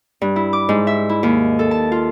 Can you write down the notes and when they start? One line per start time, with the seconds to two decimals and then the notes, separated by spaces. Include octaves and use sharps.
0.22 G2
0.36 E4
0.53 D6
0.69 G#2
0.87 E5
1.09 E4
1.23 D#2
1.59 A4
1.71 A5
1.92 F4